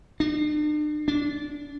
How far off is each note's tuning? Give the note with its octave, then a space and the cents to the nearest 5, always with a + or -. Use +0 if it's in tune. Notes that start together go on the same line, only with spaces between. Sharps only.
D4 +40
D4 -20